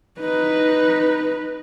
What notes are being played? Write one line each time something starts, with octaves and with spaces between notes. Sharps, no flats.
D#4 B4